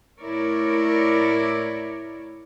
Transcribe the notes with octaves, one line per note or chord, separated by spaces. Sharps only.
A2 E4 A#4 C#5 D5